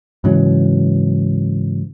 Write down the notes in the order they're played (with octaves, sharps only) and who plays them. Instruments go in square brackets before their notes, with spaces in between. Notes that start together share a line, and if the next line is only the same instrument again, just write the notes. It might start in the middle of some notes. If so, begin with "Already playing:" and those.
[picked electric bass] G#2 C#3 E3 F#3